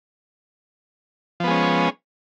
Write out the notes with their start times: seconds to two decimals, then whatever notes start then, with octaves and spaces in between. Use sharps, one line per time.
1.40 F3
1.44 B3
1.47 G#3
1.51 C#4